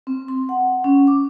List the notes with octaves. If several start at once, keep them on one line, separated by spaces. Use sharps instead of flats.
C4
C6
F#5
C#4
D6